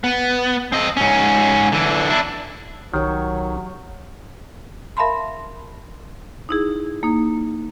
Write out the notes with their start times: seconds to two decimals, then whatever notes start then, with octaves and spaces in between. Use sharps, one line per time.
0.04 B3
0.72 C4 D#5
0.97 G#2 C#4
1.72 D3 E3
2.10 D4 E4
2.94 B1 D#3 F#3 G4 C#5
4.97 A#4 E5 F5 A5 B5 C6
6.49 D#4 E4 G#4
7.03 A#3 D#4